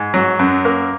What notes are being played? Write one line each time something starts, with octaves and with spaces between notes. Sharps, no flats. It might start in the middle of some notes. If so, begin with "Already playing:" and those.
Already playing: G#2
F#3
F#2
A#3